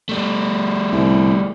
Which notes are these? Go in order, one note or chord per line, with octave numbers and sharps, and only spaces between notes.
G3 A3
C2